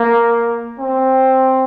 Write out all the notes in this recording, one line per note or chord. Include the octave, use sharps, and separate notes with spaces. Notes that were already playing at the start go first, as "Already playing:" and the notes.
Already playing: A#3
C4